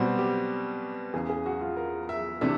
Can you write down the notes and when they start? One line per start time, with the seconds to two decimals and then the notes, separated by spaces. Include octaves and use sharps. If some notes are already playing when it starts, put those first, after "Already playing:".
Already playing: B2 G3 C4 F#4
0.19 G4
1.13 E2 C#3 E3 G#4
1.29 G#4
1.46 F#4
1.61 F4
1.77 A#4
2.09 E5
2.41 C3 E3 A3 D4 E5